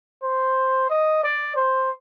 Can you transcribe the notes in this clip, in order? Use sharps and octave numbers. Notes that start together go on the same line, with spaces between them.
C5
D#5
D5
C5